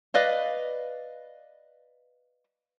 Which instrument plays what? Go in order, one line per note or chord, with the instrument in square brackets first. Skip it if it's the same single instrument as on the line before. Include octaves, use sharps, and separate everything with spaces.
[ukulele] B4 D5 D#5 F5